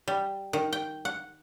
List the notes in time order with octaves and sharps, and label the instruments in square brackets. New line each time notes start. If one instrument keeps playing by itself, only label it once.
[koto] G3
D#3
G5
F#5